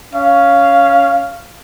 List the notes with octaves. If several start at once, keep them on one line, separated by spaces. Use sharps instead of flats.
C#4 F5